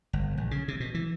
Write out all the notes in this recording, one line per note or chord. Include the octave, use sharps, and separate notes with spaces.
G1
A#1
C#3
C3
B2
E3